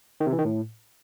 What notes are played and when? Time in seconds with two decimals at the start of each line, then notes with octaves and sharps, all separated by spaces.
0.20 D#3
0.27 C3
0.33 E3
0.39 D#3
0.45 A2